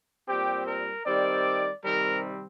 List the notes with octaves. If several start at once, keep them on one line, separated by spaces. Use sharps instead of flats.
A#2 G3 C4 G4
A#4
D#3 G3 C4 D5
C3 D#3 G3 C4 A#4